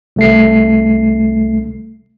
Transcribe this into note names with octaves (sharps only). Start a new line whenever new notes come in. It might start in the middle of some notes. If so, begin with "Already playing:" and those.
C2 A3 C7